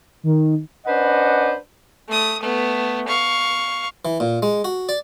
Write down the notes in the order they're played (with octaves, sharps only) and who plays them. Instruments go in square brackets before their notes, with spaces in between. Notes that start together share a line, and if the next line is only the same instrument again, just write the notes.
[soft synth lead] D#3
[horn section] C#4 D4 B4 C5 D#5 F#5
[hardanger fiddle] A3 D#6
A3 B3
F5 C#6
[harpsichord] E3
A#2
G#3
F#4
D5